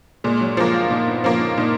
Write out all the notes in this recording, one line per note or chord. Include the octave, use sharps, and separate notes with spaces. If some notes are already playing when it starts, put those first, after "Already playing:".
A#2 G#3
F#3
F3 G#3 A#3
F4
A#2 D#4
B3
F3 A#3 C#4
D#4
A#2 D#4